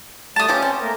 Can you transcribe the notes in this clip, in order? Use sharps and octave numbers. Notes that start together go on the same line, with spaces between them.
D2 G3 A3 A5 D#6 A6
F3 B3 C#4 G4
C4
A3 A#3 A#4